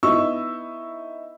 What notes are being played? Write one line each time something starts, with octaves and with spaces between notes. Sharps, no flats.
B3 D#4 E4 C#6 E6